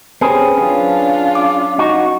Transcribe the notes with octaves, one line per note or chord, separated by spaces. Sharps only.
C4 C#4 G4 G#4 B4
F#3 C#4 D4 F4
D6
D#4 F#4